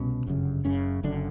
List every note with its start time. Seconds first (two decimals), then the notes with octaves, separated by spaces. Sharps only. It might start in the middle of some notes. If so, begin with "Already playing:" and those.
Already playing: C2 B2 C#4
0.26 G1 F#2 C#3
0.64 F#1 F#2 C#3 C#4
1.03 F#1 F#2 D3 D4